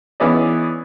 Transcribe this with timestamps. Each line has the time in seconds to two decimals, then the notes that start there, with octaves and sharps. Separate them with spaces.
0.20 E3 B3 C#4 G#4 D5 D#5